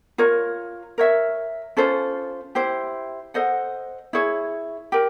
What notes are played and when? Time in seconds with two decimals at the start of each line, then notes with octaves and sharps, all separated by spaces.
0.18 F4 A#4 C#5
0.98 A#4 C#5 E5
1.77 C#4 F4 A4 C5
2.55 E4 G4 C5
3.34 A4 C5 D#5 F#5
4.13 E4 G#4 C#5
4.92 G4 A#4